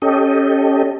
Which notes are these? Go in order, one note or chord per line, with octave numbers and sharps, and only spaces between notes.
C#4 G4 A4 D#5